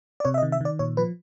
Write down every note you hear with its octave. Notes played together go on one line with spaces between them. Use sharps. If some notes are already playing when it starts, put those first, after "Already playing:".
D5
C3 C#5
E5
D#5
D#3
E5
D#3 D5
A#2 C#5
F3 B4